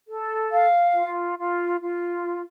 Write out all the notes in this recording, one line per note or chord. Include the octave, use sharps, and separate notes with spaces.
A4
F5
F4
F4
F4